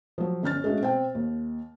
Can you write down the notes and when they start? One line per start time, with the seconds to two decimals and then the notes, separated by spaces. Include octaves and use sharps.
0.18 F3 F#3
0.43 G1 C#4 F6 A6
0.64 G#3 A3 C#4 F#4
0.81 B2 C4 G5
1.15 D#2